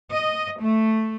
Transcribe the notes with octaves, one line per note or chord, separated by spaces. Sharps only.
D#5
A3